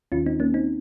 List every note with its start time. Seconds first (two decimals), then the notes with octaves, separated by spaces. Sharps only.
0.12 D#2 D#3 C#4 F4
0.26 C4 D#4
0.40 A#3 C#4
0.54 C4 D#4